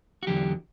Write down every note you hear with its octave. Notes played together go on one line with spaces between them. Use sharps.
F#4
E2 D3 F#3 G4